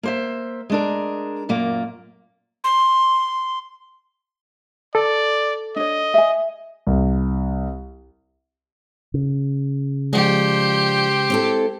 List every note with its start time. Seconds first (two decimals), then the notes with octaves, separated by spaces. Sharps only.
0.03 A#3 C5 E5
0.70 G#3 D4 A#4
1.49 F#2 A#2 A#3
2.64 C6
4.95 A4 D5
5.76 D4 C#5 D#5
6.14 E5 G#5
6.87 C2
9.14 C#3
10.13 F3 G#3 G4 C5 D5
11.30 C4 E4 A4